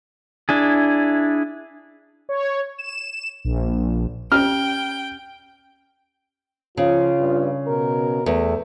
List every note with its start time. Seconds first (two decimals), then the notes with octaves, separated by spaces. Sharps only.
0.49 D4 E4 G#4
2.29 C#5
2.78 E7
3.45 A#1
4.32 C#4 G4 G5 F6
6.77 C#3 F3 F4
7.20 G2
7.67 B2 A#4
8.26 E2 A3